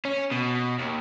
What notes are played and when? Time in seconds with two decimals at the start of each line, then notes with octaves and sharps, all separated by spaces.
0.05 C#4
0.31 B2
0.79 D#2